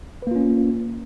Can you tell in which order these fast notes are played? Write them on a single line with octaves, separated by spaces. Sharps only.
B4 A#3 F4 C#4